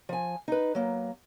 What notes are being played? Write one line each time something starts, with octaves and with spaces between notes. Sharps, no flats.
F3 G#5
D#4 B4
F#3 A#3